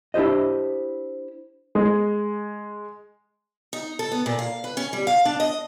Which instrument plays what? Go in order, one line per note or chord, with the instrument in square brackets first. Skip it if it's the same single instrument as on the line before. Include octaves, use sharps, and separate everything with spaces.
[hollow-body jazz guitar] D4 E4 G4 C5 D#5
[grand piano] G#3
[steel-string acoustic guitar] D#4
A4
B3
A#2
F5
B4
C#4
G3
F5
D4
D#5